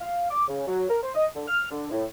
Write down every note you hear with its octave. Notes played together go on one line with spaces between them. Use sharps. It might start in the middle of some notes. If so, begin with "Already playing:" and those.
F5
D6
C#3
F#3
A#4
C5
D#5
D3
F6
D3
A2